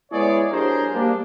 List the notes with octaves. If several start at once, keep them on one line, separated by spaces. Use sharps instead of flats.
G#3 B3 E4 G#4 C#5 D5
F#3 D4 G4 G#4 A#4 C5
G3 A#3 D4